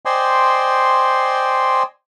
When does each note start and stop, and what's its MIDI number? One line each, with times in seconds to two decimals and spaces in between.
0.05 1.83 72
0.05 1.83 74
0.05 1.83 75
0.05 1.83 79
0.05 1.83 80
0.05 1.83 84